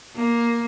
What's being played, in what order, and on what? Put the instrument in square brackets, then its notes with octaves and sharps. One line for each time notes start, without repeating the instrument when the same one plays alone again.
[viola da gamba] A#3